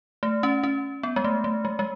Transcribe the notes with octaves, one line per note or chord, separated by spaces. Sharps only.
A3
C#4
C#4
B3
G#3
A3
A3
G#3
G#3